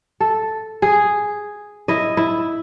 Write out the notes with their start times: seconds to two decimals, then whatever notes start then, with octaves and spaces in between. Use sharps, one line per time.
0.20 A4
0.82 G#4
1.88 E4 D#5
2.17 E4